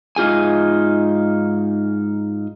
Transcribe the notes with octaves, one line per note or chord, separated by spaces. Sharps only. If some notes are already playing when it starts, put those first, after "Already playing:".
G#2 D#4 F4 G#4 G#5